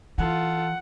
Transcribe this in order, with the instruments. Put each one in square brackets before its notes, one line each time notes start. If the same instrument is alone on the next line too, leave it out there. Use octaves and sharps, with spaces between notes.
[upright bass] E3 [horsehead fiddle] F4 A4 [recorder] F#5